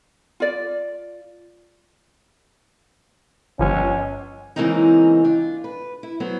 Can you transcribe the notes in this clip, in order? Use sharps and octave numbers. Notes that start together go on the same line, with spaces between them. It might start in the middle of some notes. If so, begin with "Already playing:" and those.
F4 D5
G1 F3 C#4
C#3 E3 G#3 A#3 C4 D#4
D4 F4
B4
E4
F#3 B3 C5